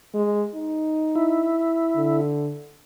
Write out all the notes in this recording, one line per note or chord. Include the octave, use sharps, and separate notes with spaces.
G#3
D#4
E4
D3